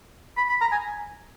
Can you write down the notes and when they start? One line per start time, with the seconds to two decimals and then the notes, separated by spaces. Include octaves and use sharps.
0.37 B5
0.49 B5
0.61 A#5
0.72 G#5